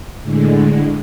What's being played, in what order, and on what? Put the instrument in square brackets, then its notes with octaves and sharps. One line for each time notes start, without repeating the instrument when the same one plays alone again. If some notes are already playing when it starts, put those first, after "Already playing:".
[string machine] A2 D3 G#3